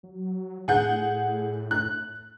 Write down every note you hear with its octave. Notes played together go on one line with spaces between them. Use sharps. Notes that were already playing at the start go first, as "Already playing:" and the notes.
F#3
A2 G#4 F#5 G6
F#6